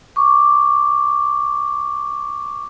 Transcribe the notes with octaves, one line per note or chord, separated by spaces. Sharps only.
C#6 D6